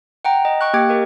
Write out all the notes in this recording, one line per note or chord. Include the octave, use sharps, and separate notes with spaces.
F#5 G5 A#5
D#5
G5 C#6 F#6
A#3 G4 G5 D6 G#6
G4 A#4 D#5